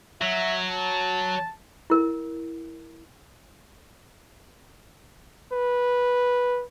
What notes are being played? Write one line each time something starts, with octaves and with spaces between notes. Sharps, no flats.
F#3 E5
A5
E4 A#4
B4